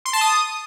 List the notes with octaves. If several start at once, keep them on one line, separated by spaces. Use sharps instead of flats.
C6
A5
D#6